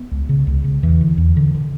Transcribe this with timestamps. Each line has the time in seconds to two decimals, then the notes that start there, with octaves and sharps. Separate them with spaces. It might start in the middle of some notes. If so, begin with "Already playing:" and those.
Already playing: B3
0.11 C#2
0.29 C#3
0.47 C#2
0.64 C#3
0.83 E2 E3
1.01 D3
1.18 E2
1.37 D3
1.55 D3